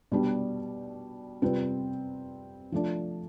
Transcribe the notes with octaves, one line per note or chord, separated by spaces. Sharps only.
B2 G3 D4 G4
C3 G3 C4 F4 B4
F3 A3 D4